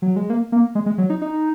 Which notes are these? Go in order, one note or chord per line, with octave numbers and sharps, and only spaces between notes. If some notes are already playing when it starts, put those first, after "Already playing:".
F#3
G#3
A#3
A#3
G#3
G#3
F#3
D#4
D#4